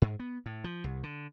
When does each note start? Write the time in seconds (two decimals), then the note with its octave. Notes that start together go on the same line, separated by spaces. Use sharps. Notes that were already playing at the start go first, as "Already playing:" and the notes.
0.02 G#2
0.19 B3
0.46 A2
0.64 F3
0.84 C2
1.03 D3